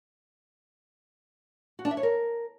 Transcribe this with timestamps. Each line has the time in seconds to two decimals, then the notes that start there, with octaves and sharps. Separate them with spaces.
1.79 F#4
1.85 D4
1.91 E5
1.97 C#5
2.03 A#4